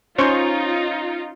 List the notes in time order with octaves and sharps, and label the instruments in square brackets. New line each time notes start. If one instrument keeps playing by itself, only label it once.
[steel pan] C#4 C5 C#5 [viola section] D#4 F4